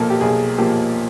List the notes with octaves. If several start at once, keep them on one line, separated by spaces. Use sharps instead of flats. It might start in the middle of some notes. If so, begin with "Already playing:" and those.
Already playing: B1 A#2 F3 A#3 A4
G4
B1 G#4
A#2 F3 A#3 G4